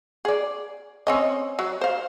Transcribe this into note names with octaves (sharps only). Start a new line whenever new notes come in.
G#4 D5
C4 C#4 D#5
F#3
C5 F5